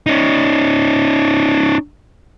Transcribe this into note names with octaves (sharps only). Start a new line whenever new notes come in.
C#4 D#4